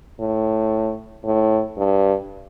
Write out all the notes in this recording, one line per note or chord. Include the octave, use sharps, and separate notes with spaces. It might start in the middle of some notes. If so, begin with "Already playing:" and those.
A2
A2
G2